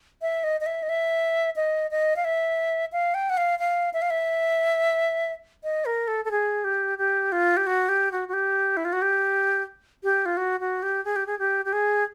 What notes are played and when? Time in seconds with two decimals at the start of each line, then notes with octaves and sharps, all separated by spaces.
0.22 E5
0.44 D#5
0.61 D#5
0.66 E5
0.83 D#5
0.89 E5
1.56 D#5
1.91 D#5
2.16 F5
2.24 E5
2.92 F5
3.14 G5
3.30 F#5
3.37 F5
3.59 F5
3.94 E5
4.02 F5
4.10 E5
5.64 D#5
5.85 A#4
6.08 A4
6.25 A4
6.31 G#4
6.64 G4
6.98 G4
7.32 F4
7.57 G4
7.67 F#4
7.89 G4
8.12 F#4
8.28 F#4
8.33 G4
8.77 E4
8.85 F4
8.93 F#4
9.02 G4
10.03 G4
10.26 F4
10.37 F#4
10.60 F#4
10.83 G4
11.05 G#4
11.16 G4
11.27 G#4
11.39 G4
11.65 G4
11.73 G#4